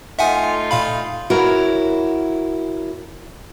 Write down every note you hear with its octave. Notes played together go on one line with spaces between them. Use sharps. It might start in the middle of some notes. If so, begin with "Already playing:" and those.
A3 D#4 F4 E5 F#5 G#5
A#2 F5 B5
E4 F#4 A#4 C#5